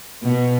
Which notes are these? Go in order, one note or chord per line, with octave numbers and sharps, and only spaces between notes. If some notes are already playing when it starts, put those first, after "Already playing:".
B2